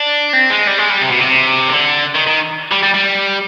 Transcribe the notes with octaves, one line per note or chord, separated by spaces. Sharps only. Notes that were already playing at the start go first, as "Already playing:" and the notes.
Already playing: D4
C4
G#3
G3
G#3
G3
C3
B2
C3
D3
D#3
D#3
G3
G3
G3